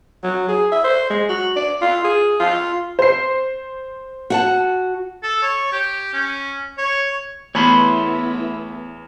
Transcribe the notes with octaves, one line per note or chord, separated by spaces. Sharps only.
F#3
G#4
E5
C5
G#3
F#4
D5
F4
G#4
F4
C5 C7
F#4 F#5 A5
A4
C#5
G4
C#4
C#5
E2 A3 B3 E4 C#5 B5 C6